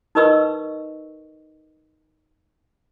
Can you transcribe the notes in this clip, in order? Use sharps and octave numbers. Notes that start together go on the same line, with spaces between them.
D#4 A#4 B4 D#5 C#6 E6